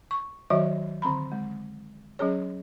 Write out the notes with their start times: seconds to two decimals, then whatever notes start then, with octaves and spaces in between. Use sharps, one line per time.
0.11 C#6
0.50 D#3 F#3 F#4 C#5 D5 E5
1.02 D3 C4 A#5 B5
1.32 G#3
2.19 F#3 C#4 G#4 C#5